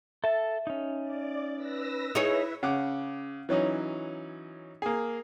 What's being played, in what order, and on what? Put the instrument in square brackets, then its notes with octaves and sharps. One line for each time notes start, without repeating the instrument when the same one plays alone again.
[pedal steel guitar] A4 A5 [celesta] E5
[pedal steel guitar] C#4 D#4
[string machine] D5
B4 E6 A#6
[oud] D#4 G#4 C#5 [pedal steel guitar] E4 [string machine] B4 E5
[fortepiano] C#3 F#5 D6
E3 F#3 C#4 D#4
A#3 G#4